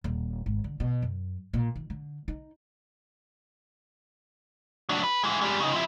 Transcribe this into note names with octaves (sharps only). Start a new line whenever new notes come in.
D#1
G#1
D3
B2
F#2
A#2
D#3
D3
D#4
F#3 D4
B4
E3 G#3
G3 G#3
C#3 D#4
F3 E4